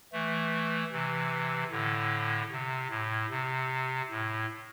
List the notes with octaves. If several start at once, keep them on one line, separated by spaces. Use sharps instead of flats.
E3 A3
C3 E3
A2 D3
C3
A2
C3
A2